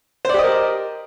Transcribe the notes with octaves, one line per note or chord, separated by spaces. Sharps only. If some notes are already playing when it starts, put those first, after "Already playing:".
G4 A#4 C5 D5 D#5